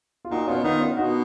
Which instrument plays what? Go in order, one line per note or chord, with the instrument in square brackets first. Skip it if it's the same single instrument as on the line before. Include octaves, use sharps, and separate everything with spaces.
[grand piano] F4
[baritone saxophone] A#2 [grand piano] D#4 F#4
[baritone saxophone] B2 [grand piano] C#4 F4
[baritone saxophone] D#3 [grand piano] B3 D#4
[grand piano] C#4 F4
[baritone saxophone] B2 [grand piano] D#4 F#4